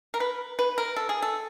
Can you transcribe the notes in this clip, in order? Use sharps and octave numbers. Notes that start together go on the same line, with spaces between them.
A#4
B4
B4
A#4
A4
G#4
A4